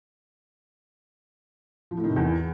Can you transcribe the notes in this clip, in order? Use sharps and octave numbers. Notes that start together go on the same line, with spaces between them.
F3
A2
D#3
C3
E2